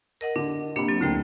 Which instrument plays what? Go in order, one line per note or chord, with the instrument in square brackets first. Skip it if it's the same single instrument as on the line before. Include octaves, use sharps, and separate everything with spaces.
[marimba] A#4 D#5 F#5
[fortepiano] D3 [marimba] D4
[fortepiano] C3 B5 [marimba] A#3 D4
[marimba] F#3 C4
[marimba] D2 A3 G5 [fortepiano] D3 A#3